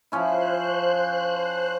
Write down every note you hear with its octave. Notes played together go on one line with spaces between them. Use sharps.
F3 C#4 E4 C5 F#6